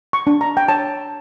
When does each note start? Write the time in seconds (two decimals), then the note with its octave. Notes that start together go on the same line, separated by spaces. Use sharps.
0.13 C#6
0.27 D4
0.41 A#5
0.57 G5
0.68 C#5 A5